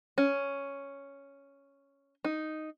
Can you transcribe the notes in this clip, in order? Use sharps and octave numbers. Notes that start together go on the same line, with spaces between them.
C#4
D#4